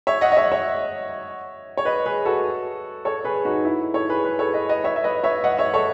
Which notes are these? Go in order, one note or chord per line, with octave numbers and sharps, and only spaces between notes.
C#5 E5
D#5 F#5
D#5
C#5 E5
C#5 E5
C#5
B4 D#5
G#4 B4
F#4 A4
A4 C#5
G#4 B4
D#4 F#4
E4
A4 C#5
G#4 B4
G#4 B4
A4 C#5
B4 D#5
B4 D#5
C#5 E5
E5
B4 D#5
C#5 E5
D#5 F#5
C#5 E5
A4 C#5